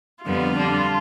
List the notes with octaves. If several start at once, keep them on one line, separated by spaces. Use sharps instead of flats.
F2 D3 G3 B3 F4
D3 G3 D4